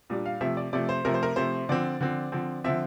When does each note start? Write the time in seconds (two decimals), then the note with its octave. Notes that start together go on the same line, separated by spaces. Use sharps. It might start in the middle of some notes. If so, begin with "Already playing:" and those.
0.10 A#2 G3 D4
0.26 F5
0.41 C3 F3 A3 E5
0.57 D5
0.73 C3 F3 A3 D5
0.89 C5
1.05 C3 F3 A3 A#4
1.14 C5
1.23 A#4
1.36 C3 F3 A3 C5
1.69 D3 F3 C4 D5
2.01 D3 F3 C4
2.32 D3 F3 C4
2.64 D3 F3 C4 E5